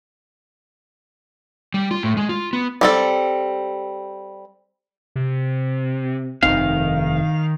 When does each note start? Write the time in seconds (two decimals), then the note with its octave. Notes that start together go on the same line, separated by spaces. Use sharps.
1.74 G3
1.91 F4
2.03 A2
2.17 G#3
2.29 F4
2.53 B3
2.81 G3 C4 A4
5.16 C3
6.43 F1 G2 D#3 C4 F5